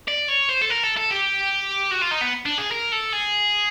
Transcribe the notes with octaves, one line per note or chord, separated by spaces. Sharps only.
D5
C#5
C5
A4
A#4
A4
A4
G4
F#4
F4
D#4
B3
D4
G#4
A#4
A4
G#4